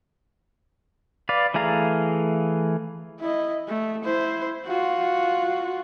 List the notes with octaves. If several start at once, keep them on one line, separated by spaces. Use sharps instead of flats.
B4 D5 F5
E3 A3 G#4 F5 A#5
E4 D#5
A3
E4 C5
F4 F#4